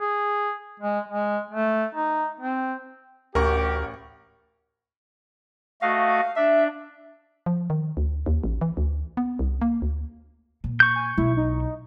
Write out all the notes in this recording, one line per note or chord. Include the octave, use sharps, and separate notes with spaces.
G#4
G#3
G#3
A3
D#4
C4
A1 D2 G4 A#4 F#5 C#6
A3 F#4 D#5 F5
D4 E5
F3
D#3
D2
D#2
A1
E3
D2
B3
C2
A#3
D2
A#2
C#6 G6
G#5
B1 E4
D#4